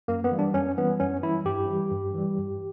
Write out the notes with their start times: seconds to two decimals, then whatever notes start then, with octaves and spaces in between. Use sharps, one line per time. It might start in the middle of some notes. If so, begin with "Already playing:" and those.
0.08 F#2 A#3
0.24 B3
0.31 E3 G3
0.39 D4
0.54 F#2 C#4
0.77 E3 G3 B3
1.00 F#2 C#4
1.23 E3 G3 E4
1.45 G2 G4
1.69 E3 G3
1.92 G2
2.14 E3 G3
2.38 G2